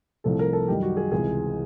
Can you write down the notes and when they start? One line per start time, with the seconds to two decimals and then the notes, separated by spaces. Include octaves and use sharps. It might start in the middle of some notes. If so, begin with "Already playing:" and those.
0.24 C2 C3 F3 A3 A4
0.39 A#4
0.53 A4
0.68 F#2 D#3 G3 G4
0.83 F#4
0.97 G#4
1.12 C#2 C3 E3 G#4